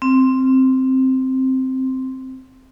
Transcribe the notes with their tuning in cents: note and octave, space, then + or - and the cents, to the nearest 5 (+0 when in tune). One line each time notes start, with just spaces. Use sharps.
C4 +0